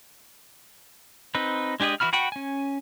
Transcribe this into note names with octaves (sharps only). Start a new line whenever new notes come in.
C4 D#4 B4
G#3 D4 G4 G#4 D#5
E3 E4 F#4 B5 F6
F#4 F#5 G5 B5 C#6
C#4 G#5